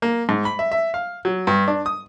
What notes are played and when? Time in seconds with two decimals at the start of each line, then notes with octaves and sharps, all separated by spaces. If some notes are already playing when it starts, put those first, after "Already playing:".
0.02 A#3
0.29 G#2
0.45 B5
0.59 E5
0.72 E5
0.94 F5
1.25 F#3
1.47 G2
1.68 D4
1.86 D#6